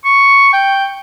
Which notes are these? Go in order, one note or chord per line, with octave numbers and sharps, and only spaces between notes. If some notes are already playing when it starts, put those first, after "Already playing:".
C#6
G5